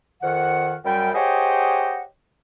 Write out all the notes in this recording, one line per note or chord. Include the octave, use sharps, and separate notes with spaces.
F2 D#3 F#5
F#2 G3 G5
G4 G#4 C5 C#5 D#5 F#5